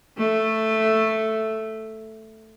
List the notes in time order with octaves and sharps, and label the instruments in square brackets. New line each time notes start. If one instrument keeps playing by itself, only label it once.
[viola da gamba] A3